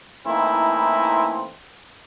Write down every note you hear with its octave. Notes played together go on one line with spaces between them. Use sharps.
E3 A3 A#3 C4 D#4 E4